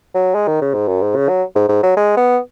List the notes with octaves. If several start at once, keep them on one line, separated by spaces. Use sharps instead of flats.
F#3
G#3
D#3
C#3
G#2
F#2
G#2
C#3
F#3
G#2
G#2
F#3
G#3
B3